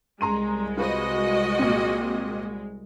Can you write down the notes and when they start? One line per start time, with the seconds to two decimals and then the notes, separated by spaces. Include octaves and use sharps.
0.21 C2 G#3 A#5 C6 D#7
0.77 F4 F#4 B4 C5 D#5
1.59 A#2 C4